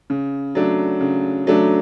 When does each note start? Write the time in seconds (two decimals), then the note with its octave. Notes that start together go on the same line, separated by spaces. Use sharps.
0.10 C#3
0.55 F#3 A3 D4
1.01 C#3
1.47 F#3 A3 D4